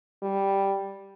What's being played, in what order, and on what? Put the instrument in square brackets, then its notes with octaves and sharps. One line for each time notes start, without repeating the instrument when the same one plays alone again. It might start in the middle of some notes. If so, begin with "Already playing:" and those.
[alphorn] G3